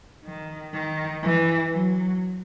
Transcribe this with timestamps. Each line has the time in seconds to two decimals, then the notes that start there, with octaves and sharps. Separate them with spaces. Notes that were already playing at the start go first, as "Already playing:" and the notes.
0.25 D#3
0.74 D#3
1.23 E3
1.73 F#3